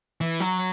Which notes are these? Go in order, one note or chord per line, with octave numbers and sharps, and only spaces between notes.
E3
F#3